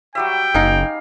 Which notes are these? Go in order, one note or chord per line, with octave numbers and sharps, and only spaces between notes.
F#3 G3 E5 G5
F#1 D#4 G#4 F5